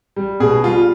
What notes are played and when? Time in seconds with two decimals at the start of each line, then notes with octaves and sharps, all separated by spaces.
0.16 G3
0.40 B2 G#4
0.64 G3 F4